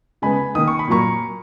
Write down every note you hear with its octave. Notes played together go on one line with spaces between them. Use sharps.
C#3 G#3 B3 G#5 B5
D#3 A#3 D#6
C#6
B5
A#2 F#3 A#3 A#5 C#6